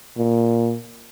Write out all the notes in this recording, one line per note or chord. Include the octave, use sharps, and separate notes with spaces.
A#2